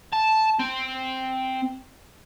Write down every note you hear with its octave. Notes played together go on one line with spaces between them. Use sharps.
A5
C4